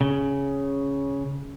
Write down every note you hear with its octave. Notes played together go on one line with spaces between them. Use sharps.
C#3